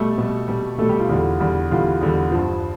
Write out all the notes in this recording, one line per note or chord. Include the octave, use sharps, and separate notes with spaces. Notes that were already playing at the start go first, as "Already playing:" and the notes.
Already playing: B2 G3 A3 A4
B2 G3
B2 G3
B2 G3 A3 A4
G3 G4
F4
E2 D3 G3
E2 D3 G3
E2 D3 G3 F4
E2 D3 G3
G2 F3